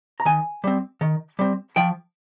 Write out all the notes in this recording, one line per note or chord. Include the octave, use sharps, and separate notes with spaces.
A#5
D#3 G#5
G3 C4
D#3
G3 C4
F3 G5